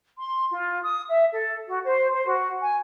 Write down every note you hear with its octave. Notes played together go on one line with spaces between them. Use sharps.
C6
F4
D#6
E5
A4
F#4
C5
C5
F#4
G#5